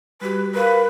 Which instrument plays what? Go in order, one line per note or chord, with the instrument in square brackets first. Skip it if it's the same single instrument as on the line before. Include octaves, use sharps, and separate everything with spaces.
[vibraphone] G3 F#4 G4 [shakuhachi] B4
[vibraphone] A#4 F5 [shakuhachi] B4